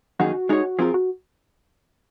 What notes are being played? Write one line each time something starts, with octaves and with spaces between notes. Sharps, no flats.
F#2 D#3 A#3 D#4 F#4 G#4
G#3 D#4 G#4 C#5
F3 C4 F4 G#4 A#4
F#4